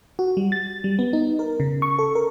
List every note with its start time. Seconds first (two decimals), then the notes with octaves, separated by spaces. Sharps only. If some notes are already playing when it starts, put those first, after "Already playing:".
0.19 F#4
0.37 G3
0.52 A6
0.84 G3
0.99 B3
1.13 D#4
1.39 A#4
1.60 C#3
1.82 C#6
1.99 A4
2.15 A#4